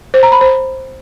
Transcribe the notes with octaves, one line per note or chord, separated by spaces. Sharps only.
C5
A#5
B5
C5